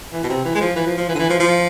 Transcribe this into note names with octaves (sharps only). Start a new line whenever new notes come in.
E3
B2
C3
E3
G#3
F3
E3
F3
F3
E3
D3
E3
F3
F3